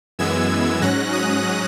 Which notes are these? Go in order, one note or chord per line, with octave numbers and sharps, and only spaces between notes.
F#2 E3 G#3 B3 E6 G#6
G#2 F#3 C#4 F#6 A#6
D#6 F#6